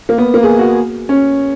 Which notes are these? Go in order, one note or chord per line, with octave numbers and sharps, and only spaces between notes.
A#3
B3
A#3
G#4
F#4
C#4